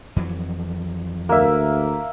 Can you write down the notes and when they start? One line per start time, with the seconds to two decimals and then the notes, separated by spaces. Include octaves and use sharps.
0.16 F2 E3 F#3
1.29 D2 A#3 E5